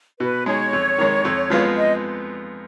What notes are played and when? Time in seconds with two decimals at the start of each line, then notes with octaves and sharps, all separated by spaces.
0.20 B2 B4
0.46 G#3 D#4 G#4 C#5
0.73 F2
0.98 D#3 G#3
1.25 F2
1.50 F3 G#3 B3 F4
1.77 D#5